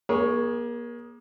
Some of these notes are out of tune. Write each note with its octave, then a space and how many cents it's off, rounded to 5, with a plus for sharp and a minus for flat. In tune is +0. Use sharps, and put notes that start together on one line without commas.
A#3 +35 G#4 +0 C#5 +0